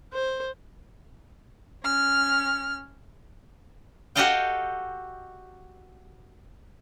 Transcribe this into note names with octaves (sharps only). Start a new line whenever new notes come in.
C5
C#4 F6
F#4 G4 A4 D#5 F5 G5